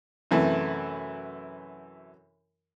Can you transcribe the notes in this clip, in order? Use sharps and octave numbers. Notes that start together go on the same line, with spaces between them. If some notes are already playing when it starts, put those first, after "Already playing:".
F#2 C3 E3 A3 E4